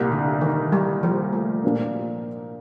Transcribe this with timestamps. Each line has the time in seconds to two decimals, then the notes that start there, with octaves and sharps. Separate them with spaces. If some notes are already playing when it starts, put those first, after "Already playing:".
Already playing: C2 A#2 G3
0.12 D3
0.41 D#3
0.72 G3
1.03 F3
1.33 A3
1.64 A#2 F3 A#3 D4